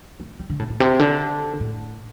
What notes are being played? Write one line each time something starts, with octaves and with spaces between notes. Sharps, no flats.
A3
G3
D3
A2
A2
C3
D3
A2